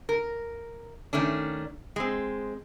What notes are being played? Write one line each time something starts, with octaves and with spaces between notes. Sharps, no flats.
A#4
D#3 A3 C#4 D4
G#3 C4